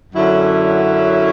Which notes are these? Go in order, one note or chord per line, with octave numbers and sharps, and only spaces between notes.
F#2 D3 F#3 C#4 E4